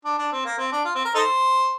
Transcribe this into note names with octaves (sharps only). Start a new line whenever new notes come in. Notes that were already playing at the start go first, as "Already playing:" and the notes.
D4
D4
C4
A#3
C4
D4
F4
C4
A#4
D#4 A4 C5